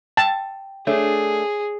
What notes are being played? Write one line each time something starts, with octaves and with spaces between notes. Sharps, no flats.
G5 A5
A3 D4 G#4 C#5